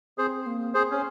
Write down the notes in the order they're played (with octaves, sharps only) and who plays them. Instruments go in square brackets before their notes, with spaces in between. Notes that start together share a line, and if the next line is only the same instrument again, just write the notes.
[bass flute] C4 [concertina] G#4 C5
[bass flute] A#3
[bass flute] C4 [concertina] G#4 C5
[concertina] C#4